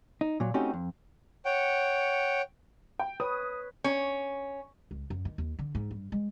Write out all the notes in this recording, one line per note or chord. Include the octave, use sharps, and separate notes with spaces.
D#4
A#2 F#3
A3 C4 C#4 D#4 F#4 G4
F2
C#5 F#5 G5
G5
B4 C#5 D#6
C#4
C#2
F#2
D#3
D#2
D3
G#2
G2
G#3